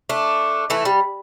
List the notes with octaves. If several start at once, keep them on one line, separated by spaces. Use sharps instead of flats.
A3 D4
E3 A3
G3